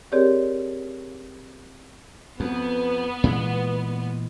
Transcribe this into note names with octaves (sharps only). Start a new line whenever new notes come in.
C4 G4 G#4 A#4 C#5 D5
F2 B3
A#2 E3 G#3